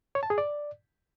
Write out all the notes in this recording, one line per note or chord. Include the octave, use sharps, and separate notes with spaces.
C#5
A5
G#4
D5